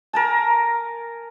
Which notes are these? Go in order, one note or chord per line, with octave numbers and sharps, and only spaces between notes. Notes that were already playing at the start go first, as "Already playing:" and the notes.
A#4 G#5 A5